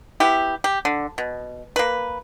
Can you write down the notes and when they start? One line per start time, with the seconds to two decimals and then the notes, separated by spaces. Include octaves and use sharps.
0.20 B3 E4 G4
0.64 G4
0.85 D3
1.18 B2
1.76 A#3 B4